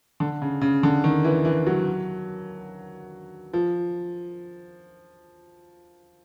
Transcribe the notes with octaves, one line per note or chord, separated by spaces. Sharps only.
D3
C#3
C#3
D3
D#3
E3
E3
F#3
F3